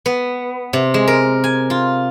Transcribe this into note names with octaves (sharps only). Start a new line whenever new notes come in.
B3
C3
G#3
A#4
G#5
F4